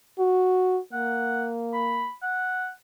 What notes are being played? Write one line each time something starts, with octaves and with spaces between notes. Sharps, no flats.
F#4
A#3 F#5
B5
F#5